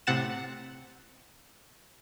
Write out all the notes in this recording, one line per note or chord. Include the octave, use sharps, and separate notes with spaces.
A2 C3 F#5 A6 E7